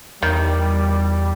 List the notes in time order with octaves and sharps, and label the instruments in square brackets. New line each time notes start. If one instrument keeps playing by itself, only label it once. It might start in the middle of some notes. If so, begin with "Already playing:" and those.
[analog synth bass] E2 [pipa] D#3 [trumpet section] G3